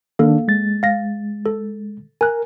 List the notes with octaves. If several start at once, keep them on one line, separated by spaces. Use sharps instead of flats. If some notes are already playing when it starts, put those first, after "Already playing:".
D#3 A#3 D4 A4 F5
G#3 A6
F5 A#6
A4
A#4 G#5 F#6